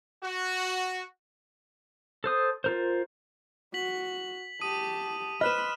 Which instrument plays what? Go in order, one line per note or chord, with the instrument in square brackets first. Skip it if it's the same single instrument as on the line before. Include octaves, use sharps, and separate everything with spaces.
[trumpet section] F#4
[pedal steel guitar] A4 C5 D#6
F4 A#4 C5
[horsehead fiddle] F#4 [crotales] B6 F#7
[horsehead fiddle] G4 A5 [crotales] D#6 D#7
[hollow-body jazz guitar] B4 C5 D#5 [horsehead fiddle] B5 [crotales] F6 F#6 E7